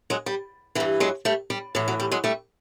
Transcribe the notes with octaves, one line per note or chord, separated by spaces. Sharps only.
F#3 G#3
G3
G2 E3 G3
F#3 G#3
G3 A3
G3
A2 E3 F#3
F#3
G3
F#3 G#3
G3 A3